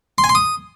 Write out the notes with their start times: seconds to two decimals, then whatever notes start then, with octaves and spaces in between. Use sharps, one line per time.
0.18 C6
0.24 G#5
0.29 C6
0.35 D#6